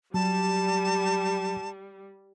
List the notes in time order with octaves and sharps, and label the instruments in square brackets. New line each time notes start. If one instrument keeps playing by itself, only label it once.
[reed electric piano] F#3 [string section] G3 [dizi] A5